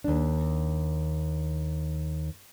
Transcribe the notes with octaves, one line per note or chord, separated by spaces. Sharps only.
D#2 D4